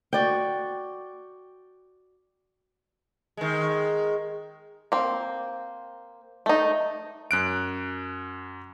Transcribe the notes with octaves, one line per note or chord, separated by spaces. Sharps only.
F#4 D5 G5
D#3 G#3
A#3 C4
A3 D#4
F#2 F#6 D7